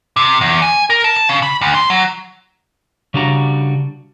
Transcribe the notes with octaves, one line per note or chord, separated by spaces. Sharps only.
C3
E2
G#5
A#4
A5
A5
C#3
B5
D2
C6
F#3
C#3 G3 D4 F#4 A#5